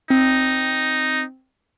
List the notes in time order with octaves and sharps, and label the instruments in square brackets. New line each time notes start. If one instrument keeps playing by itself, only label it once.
[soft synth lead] C4 [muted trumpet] D#4